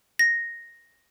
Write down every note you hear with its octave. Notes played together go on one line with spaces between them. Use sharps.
A#6